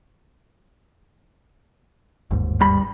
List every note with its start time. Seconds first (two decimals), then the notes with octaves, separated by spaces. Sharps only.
2.31 G1 D#2 G#2
2.61 G2 B5